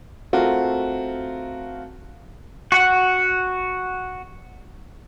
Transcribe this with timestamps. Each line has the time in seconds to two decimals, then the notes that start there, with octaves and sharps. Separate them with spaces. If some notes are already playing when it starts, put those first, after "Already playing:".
0.33 A3 C4 F4 F#4 A#4
2.72 F#4 F#5